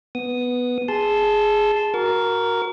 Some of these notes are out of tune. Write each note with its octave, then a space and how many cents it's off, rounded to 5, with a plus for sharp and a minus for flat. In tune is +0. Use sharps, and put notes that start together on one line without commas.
B3 +0 D#6 +0
G#4 +0 A5 -10 C6 +0
F#4 +0 A#4 +0 D6 -45